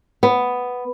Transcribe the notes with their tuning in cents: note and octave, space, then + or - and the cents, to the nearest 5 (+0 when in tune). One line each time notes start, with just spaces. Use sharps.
B3 +5